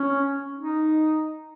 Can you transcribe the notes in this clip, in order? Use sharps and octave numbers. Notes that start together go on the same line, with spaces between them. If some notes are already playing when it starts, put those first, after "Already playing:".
Already playing: C#4
D#4